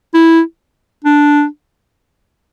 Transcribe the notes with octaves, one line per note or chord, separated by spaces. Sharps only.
E4
D4